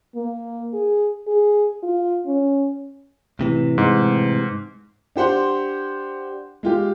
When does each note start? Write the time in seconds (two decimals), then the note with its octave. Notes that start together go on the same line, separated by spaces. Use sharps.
0.16 A#3
0.73 G#4
1.27 G#4
1.83 F4
2.26 C#4
3.39 A2 C3 E3
3.78 G#2
5.16 D4 G4 C5 F#5 C6
6.63 G#3 F4 G4